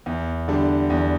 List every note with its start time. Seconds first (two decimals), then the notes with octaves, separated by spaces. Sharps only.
0.06 E2
0.48 D3 G3 D4
0.90 E2